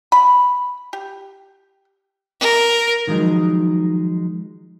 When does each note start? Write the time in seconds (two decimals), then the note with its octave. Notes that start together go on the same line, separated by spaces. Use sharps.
0.12 B5
0.93 G4
2.41 A#4
3.07 D#3 F3 F#3 G#3 D#4